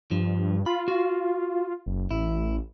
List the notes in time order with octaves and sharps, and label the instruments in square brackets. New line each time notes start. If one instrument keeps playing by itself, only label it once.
[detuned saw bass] G2 [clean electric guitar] F3
[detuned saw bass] F4 [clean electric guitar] B5
[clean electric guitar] F#4
[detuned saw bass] F#1
[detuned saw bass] A1 [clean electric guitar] E4